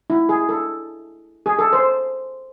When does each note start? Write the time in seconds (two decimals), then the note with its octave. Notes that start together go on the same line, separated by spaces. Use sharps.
0.10 E4
0.29 G#4
0.49 A4
1.46 G#4
1.59 A4
1.73 C5